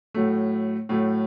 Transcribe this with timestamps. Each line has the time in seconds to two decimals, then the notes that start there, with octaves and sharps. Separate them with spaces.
0.14 A2 F#3 A3
0.89 A2 F#3 A3